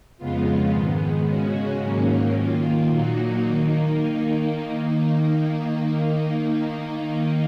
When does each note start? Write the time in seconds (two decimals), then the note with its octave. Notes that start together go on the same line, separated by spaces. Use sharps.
0.18 F2 C#3 G#3 B3 F4
0.71 G#2 D#3 G#3 B3
1.25 C#3 G#3 C#4 F#4
1.80 G#2 D#3 F#3 A#3 C#4
2.34 D#3 A#3 F4
2.89 A#2 F#3 A#3 D#4 F#4
3.43 D#3 A#3 D#4